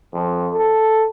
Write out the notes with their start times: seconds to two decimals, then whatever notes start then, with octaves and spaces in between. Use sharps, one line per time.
0.13 F2
0.54 A4